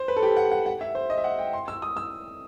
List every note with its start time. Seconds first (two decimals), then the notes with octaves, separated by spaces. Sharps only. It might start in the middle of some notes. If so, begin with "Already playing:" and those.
Already playing: C5
0.08 B4
0.17 A4
0.23 G4
0.37 F#5
0.52 F#5
0.66 F#5
0.81 E5
0.95 C5
1.10 D#5
1.18 E5
1.24 F#5
1.39 G5
1.53 C6
1.68 E6
1.82 D#6
1.97 E6